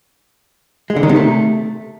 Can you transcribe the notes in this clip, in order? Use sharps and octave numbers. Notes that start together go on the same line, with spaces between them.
G#3
D3
D#3
C3
A3